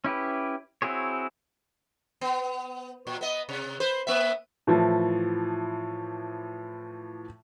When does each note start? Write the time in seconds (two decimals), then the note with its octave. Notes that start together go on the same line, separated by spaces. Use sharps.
0.04 C#4 E4 G4 B4
0.82 C4 E4 F#4 G#4 C#5
2.21 B3
3.07 A#2
3.21 B3 D#5
3.49 C3
3.80 B4 C5
4.07 A#3 B3 E5
4.67 A2 E3 F3